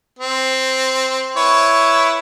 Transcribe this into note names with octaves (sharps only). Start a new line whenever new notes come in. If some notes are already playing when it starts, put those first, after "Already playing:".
C4
E4 B4 C#5